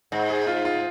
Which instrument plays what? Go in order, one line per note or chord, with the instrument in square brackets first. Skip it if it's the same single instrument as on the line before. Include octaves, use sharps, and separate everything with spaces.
[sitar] G#2
[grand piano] G#4
F4
F4